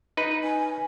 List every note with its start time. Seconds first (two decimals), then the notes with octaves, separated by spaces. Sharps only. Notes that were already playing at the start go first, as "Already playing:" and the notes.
0.17 D#4 B4
0.44 G#5